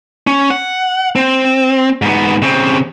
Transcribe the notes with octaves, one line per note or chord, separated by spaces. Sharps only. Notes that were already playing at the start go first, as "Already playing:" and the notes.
C#4
F#5
C4
G#2 B3
C#3 C4